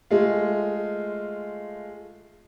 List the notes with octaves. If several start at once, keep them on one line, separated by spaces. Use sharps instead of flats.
G#3 A3 F4